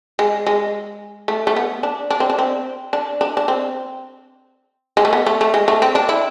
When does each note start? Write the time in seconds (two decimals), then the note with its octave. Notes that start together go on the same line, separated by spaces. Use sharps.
0.19 G#3
0.47 G#3
1.28 A3
1.47 A3
1.56 B3
1.83 D4
2.11 D4
2.20 C4
2.30 D4
2.39 C4
2.93 D4
3.21 D4
3.37 D4
3.48 C4
4.97 G#3
5.05 A3
5.13 B3
5.26 A3
5.41 A3
5.54 G#3
5.68 A3
5.82 C4
5.95 D4
6.09 E4